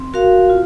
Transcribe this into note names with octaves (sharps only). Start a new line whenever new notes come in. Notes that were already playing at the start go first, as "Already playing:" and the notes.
Already playing: C4
F#4 A#4 F5
F4